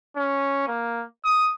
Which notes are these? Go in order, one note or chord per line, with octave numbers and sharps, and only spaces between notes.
C#4
A#3
D#6